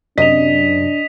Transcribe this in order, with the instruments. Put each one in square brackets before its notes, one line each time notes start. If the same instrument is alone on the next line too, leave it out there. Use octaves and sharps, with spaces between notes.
[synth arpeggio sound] F#2 C3 [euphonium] D4 [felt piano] D#5 [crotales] B6 F7